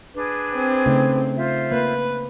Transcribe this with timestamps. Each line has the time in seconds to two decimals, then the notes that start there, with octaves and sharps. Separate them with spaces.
0.15 D4 G#4 B4
0.54 C4
0.86 C#3 A3 D#4
1.36 F4 C5 E5
1.72 A#3 B4